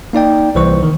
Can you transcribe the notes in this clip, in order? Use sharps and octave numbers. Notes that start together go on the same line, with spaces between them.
A#3 D#4 D5 G5
C2 E3 C5 C#6
D#3